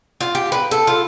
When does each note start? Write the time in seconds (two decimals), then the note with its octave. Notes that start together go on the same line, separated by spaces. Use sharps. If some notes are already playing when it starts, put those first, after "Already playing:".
0.21 F4
0.35 G4
0.52 B4
0.71 A4
0.87 F4